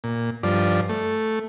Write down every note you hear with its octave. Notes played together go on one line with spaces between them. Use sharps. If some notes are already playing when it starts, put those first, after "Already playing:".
A#2
G2 F3 D5
A3